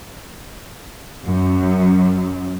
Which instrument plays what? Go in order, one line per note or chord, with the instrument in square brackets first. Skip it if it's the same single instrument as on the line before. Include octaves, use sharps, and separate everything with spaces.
[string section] F#2